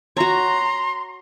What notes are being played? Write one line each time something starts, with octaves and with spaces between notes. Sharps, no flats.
F#4 C#5 A#5 C6